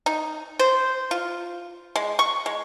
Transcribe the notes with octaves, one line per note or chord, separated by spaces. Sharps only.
D#4
C5
F4
G#3
C#6
G#3